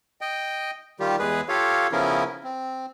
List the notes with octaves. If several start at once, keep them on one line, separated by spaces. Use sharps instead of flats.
D#5 G5
D#3 G3 F4 G4
E2 G#3 G#4 B4
F4 G4 A4 C#5 F5
C#3 F3 B3 C#4 E4 A#4
C4